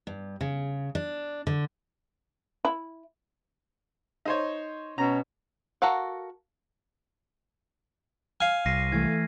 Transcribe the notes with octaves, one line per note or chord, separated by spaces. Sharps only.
G2
C#3
D4
D3
E4
D#4 C5 C#5
B2 C#4 A#5
F#4 A4 A#4 F5 F#5
F5 G#5 F6
C2 A#6 C7 D#7
E3 A3 G#6